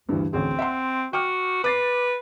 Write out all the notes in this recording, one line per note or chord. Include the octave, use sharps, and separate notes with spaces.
D2 G2 D3 E3
A1 D2 C4 G#4
E5 F#5 C6
F#4 G5 D6 F6
B4 D6 A6 C7